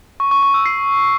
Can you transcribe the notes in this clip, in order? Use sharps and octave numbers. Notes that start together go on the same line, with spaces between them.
C#6
C#6
C#6
E6
C7